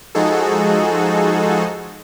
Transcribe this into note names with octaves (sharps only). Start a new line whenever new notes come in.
F3 G#3 D#4 F#4 G#4 A4